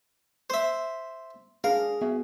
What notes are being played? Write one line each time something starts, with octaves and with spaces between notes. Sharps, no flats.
C5 E5
D4 G#4 A#4 F5
B3 F#4 G#4 E5